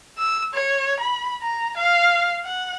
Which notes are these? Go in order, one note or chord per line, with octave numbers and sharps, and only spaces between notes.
E6
C#5
B5
A#5
F5
F#5